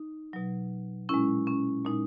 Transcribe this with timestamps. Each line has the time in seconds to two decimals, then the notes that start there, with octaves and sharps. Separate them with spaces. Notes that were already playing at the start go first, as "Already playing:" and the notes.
Already playing: D#4
0.33 B2 F#3
1.09 A#2 G#3 C#4 E4
1.47 C#4
1.85 A#2 G#3 D#4